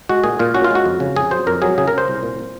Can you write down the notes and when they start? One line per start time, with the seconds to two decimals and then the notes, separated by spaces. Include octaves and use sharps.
0.09 G#3 F#4
0.24 A#2 G#4
0.39 A#2 F4
0.54 C#4 F#4
0.64 F4
0.71 G#3 F#4
0.85 F2
1.00 C#3
1.16 F2 G#4
1.31 F#3 C5
1.47 F2 A#4
1.62 F#3 G#4
1.78 C#3 G#4
1.88 A#4
1.93 C#3 C5
2.08 C2
2.23 A#2
2.39 A#2